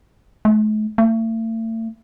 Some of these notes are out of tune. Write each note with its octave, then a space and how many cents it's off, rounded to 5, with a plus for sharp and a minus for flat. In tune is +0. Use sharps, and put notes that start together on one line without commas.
A3 -45
A3 +40